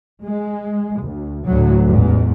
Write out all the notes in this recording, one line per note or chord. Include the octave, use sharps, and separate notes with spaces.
G#3
D2
D2 A2 F#3
A1 E2 G#2